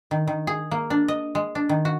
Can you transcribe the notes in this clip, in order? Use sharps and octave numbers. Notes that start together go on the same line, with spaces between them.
D#3
D#3
G#4
A#3
D4
D#5
G#3
D4
D#3
F#4